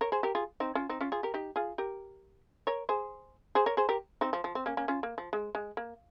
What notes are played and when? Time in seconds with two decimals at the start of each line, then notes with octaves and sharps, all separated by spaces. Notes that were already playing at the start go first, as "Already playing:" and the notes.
0.01 A#4 C#5
0.12 G#4 C5
0.23 G4 A#4
0.35 F4 G#4
0.60 C4 D#4
0.75 C#4 F4
0.89 C4 D#4
1.01 C#4 F4
1.12 F4 G#4
1.23 G4 A#4
1.34 D#4 G4
1.56 F4 G#4
1.78 G4 A#4
2.67 A#4 C#5
2.89 G#4 C5
3.55 G#4 C5
3.66 A#4 C#5
3.77 G#4 C5
3.89 G4 A#4
4.21 C4 D#4
4.33 F3
4.44 F3
4.55 C4
4.66 A#3 C#4
4.77 A#3 C#4
4.88 C#4 F4
5.03 A#3
5.18 F3
5.33 G#3
5.55 G#3
5.77 A#3